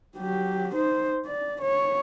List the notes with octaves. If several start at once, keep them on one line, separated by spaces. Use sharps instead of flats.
F#3 G4
D#4 C5
D5
C#5